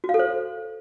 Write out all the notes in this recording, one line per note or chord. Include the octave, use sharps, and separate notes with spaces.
F#4
F5
A4
C5